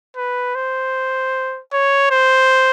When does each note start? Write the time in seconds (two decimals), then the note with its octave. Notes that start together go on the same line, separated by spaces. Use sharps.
0.17 B4
0.55 C5
1.72 C#5
2.11 C5